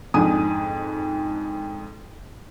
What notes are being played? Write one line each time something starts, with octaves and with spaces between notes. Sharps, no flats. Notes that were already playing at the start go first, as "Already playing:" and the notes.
F2 G#2 D4 G#5 D#6